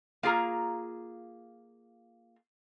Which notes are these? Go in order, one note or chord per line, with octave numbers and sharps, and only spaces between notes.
A#3 F4 G#4 A#5